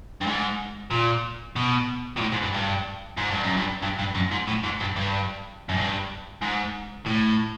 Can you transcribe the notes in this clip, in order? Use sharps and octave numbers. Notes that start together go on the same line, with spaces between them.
G2
G#2
A#2
B2
A#2
A2
G#2
G2
G2
G#2
G2
F#2
G2
G2
G2
F#2
G#2
A2
G#2
G2
G2
F#2
G2
G#2
A2